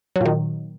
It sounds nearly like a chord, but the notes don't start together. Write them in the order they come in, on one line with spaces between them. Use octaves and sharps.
F#3 A#2 D#3